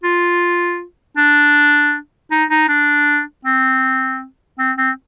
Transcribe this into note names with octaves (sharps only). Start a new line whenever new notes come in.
F4
D4
D#4
D#4
D4
C4
C4
C4